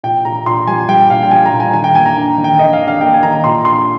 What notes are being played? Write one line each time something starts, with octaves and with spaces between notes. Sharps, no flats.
A#2 G5
A#2 A#5
A#2 C6
G3 G#5
G3 G5
A#2 F5
G5
G3 G#5
A#5
A#2
G#5
D#3 G#5
G5
A#3 G#5
A#5
D4
D#3
G5
D4 D#5
F5
D4
F5
A#3 G5
G#5
D#3 A#5
A#2 C6
D4 C6